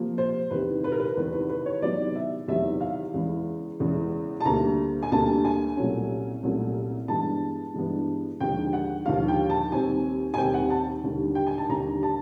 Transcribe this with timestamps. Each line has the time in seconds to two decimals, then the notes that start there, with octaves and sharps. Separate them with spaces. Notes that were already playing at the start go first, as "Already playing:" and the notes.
Already playing: C3 F3 A#3
0.18 C5
0.51 E2 C3 D#3 B4
0.84 B4
0.92 A#4
1.00 B4
1.16 E2 C3 D#3 B4
1.33 B4
1.49 B4
1.66 C#5
1.82 E2 C3 D#3 F#3 B3 D5
2.15 E5
2.48 E2 C3 D#3 F#3 B3 E5
2.81 F5
3.14 E2 C#3 E3 G#3
3.80 E2 C#3 E3 G#3
4.40 A5
4.45 D2 D3 G3 A#3 A#5
5.03 G#5
5.12 D2 D3 G3 A#3 A5
5.45 G#5
5.77 C2 A#2 F#3 A3 C#4
6.43 C2 A#2 F#3 A3 C#4
7.08 G2 E3 G#3 B3 D4 A5
7.74 G2 E3 G#3 B3 D4
8.40 D#2 D3 F3 G#3 G5
8.73 F#5
9.06 D#2 D3 F3 G#3 F5
9.28 G5
9.50 A5
9.72 D#2 D#3 G3 C4 G#5
10.34 G#5
10.38 D#2 D#3 G3 C4 G5
10.54 F#5
10.70 A5
11.04 D#2 D3 G3
11.35 G5
11.47 G#5
11.58 A5
11.69 D#2 D3 G3 A#5
12.03 A5